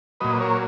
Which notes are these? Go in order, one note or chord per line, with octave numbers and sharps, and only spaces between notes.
A#2 F#3 B4 D#5
A#4 C#5